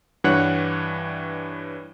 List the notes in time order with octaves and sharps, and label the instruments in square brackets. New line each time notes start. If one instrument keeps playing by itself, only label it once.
[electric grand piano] G2 E3 D4 C#5 F#5 F#6